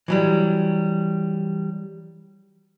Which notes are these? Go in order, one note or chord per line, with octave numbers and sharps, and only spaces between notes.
E3 F#3 G3